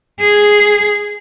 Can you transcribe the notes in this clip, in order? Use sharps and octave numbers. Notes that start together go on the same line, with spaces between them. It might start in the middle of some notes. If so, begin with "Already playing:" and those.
G#4